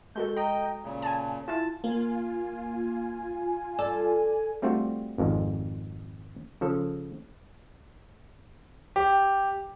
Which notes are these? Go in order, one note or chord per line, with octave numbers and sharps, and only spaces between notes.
G#3 F#4 A4 G6
D#5 G5 A#5
A#2 C#3
G#5 A5
E4 F4 A5
A#3 F4 G#5
A4 D5
G3 A3 C4 D4 F4 F#4
G#1 F2 G#2
C#3 F3 A4
G4